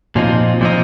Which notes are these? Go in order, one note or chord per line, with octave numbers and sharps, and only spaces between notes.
A#2 F3 C4 D#4
A#2 F3 C4 D#4